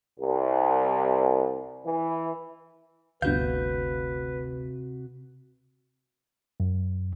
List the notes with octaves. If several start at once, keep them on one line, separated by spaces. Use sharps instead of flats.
C2
E3
G1 D2 C3 F#4 B4 F5 G6
F#2